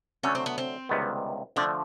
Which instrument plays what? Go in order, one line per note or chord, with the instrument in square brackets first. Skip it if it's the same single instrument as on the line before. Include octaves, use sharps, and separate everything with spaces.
[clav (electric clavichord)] D3 F#3 A3 [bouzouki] C#4
[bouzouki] C4
B3
C4
[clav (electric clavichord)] C#2 C3 D#3 G3 B3
[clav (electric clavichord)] D3 F3 A3 [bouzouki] D4